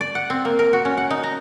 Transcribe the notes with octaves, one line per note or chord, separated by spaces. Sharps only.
D5
F#5
C4
A#3
A#4
F#4
C#4
F#5
D#4
A#5